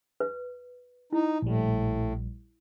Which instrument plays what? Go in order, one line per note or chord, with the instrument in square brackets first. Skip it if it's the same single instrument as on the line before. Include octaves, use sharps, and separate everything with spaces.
[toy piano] B4
[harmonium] D#4 [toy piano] E4
[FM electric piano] A#1 G3 [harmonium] A2